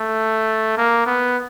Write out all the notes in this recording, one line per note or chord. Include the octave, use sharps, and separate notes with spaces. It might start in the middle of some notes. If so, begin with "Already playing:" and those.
Already playing: A3
A#3
B3